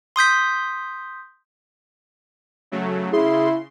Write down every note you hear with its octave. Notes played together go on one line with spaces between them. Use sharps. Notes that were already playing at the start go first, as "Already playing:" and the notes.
C6 D#6 G6 B6
C#3 F#3 A3
C#3 E4 G#4 C6